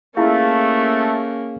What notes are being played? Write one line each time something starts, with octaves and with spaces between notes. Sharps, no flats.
A3 A#3 C#4 E4 F4 G#4 D5 F5